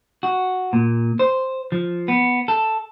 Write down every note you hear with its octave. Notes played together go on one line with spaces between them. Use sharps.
F#4
A#2
C5
F3
B3
A4